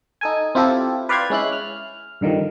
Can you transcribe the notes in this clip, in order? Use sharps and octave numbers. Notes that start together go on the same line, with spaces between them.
D#4 A4 G#5
C4 E4 F4 G4 A4
B4 D5 F5 G5 C6 G#6
G#3 C#4 E4 F#6
F6
G2 D3 D#3 F3 G3